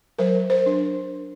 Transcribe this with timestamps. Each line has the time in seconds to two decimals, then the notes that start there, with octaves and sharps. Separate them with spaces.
0.19 F#3 A#4 C5
0.50 A#4 C5
0.66 D4